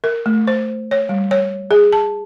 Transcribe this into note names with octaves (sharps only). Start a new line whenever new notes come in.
A#4
A3
C5
C#5
G3
C#5
G#4
A5